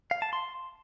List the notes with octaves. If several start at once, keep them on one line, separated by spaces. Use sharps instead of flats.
F5
A5
C6